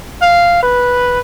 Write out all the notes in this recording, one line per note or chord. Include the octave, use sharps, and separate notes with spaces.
F5
B4